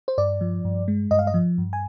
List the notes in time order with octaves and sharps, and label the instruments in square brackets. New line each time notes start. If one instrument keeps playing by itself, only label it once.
[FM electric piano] C5
G2 D5
F3
G2
G#3
G2 D#5
F5
D#5
F3
G2
G#5